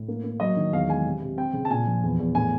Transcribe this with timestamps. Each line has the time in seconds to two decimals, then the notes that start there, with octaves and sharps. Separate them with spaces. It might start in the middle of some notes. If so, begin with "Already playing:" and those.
Already playing: A2
0.08 A#3
0.24 A#3
0.40 F#3 D#5
0.56 D#3
0.73 E2 F5
0.88 G#3 G#5
1.05 C3
1.22 C3
1.37 C4 G5
1.53 C#3
1.65 A5
1.70 A#2 G#5
1.86 F3
2.03 E2
2.20 E2
2.35 A2 G#5